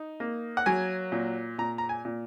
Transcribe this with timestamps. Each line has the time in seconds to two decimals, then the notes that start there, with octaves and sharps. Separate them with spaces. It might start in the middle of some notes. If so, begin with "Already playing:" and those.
Already playing: D#4
0.20 A#3
0.57 F#5
0.66 F#3 G#5
1.12 A#2
1.58 A#2 A#5
1.78 A#5
1.89 G#5
2.05 A#2